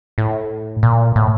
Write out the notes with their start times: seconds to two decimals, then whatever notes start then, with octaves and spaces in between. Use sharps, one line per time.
0.18 A2
0.83 A#2
1.16 A2